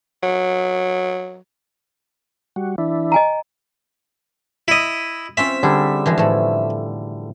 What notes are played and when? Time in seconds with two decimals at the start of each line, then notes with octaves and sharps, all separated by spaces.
0.23 F#3
2.56 G3 F#4
2.78 E3 D4 E4
3.12 D#5 G#5 A#5
4.68 E4 D#5
5.37 C4 C#4 F4 E5
5.63 D3 G3 G#4
6.06 E3 F3 G#3
6.18 A2 A3